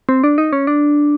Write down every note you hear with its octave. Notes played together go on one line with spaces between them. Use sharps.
C4
D4
D#4
C#4
D4